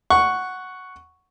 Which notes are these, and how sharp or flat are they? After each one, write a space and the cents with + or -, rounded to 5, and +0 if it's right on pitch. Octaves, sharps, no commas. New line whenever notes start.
F#5 +0 C#6 +0